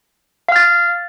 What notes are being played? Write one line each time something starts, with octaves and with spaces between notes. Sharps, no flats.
F5 F6 A6